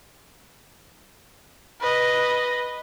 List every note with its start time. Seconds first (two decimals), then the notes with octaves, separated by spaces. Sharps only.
1.81 B4 D#5